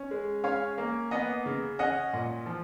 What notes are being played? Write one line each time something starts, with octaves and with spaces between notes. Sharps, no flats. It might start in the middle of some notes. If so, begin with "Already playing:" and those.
Already playing: C#4
G#3
C#4 C#5 F5
A#3
B3 D#5 F#5
C#3
C#4 D#5 F#5
A#2
F3